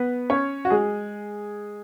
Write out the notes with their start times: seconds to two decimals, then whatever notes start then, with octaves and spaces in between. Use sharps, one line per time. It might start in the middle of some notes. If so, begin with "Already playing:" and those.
Already playing: B3 B4
0.30 C#4 C#5
0.65 F#4
0.70 G#3 G#4